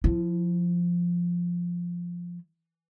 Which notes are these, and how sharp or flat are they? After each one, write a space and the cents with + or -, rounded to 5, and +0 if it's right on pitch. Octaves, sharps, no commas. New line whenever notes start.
F3 +0 E4 +30